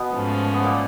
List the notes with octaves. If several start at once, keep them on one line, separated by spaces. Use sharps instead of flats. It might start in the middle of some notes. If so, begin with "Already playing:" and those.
Already playing: B2 B3
G#2 F3 A3 C#4
B3
A#2 A#3